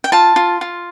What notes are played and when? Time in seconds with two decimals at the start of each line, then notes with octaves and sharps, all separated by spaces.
0.04 G5
0.12 F4 A5
0.36 F4
0.61 F4